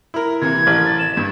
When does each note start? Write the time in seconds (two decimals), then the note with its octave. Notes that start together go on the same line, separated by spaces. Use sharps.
0.14 E4 A#4
0.42 C3 E3 A#3 G#6
0.67 A1
0.85 A6
0.99 E7
1.17 G2 G#6